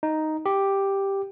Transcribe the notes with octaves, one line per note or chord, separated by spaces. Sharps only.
D#4
G4